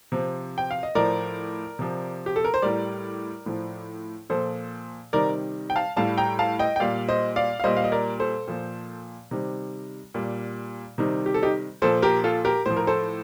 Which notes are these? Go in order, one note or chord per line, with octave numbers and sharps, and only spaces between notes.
C3 F3
G5
F5
D#5
A2 F3 A#4 D5
C3 F3
G4
A4
A#4
C5
A2 G3 A#4 D5
A2 F3
A#2 F3 A4 C5
C3 D#3 G3 A#4 D5
G5
F5 A5
A2 G3 F5 A5
G5 A#5
F5 A5
D#5 G5
G5
A#2 G3 D5 F5
C5 D#5
D5 F5
F5
A#2 G3 C5 D#5
F5
D#5
A#4 D5
A4 C5
A#2 F3
C3 D#3 G3
A#2 G3
C3 D#3 G3
G4
A4
D#4 G4
A#2 F3 A4 C5
G4 A#4
F4 A4
G4 A#4
A2 F3 C5
A#4
A4 C5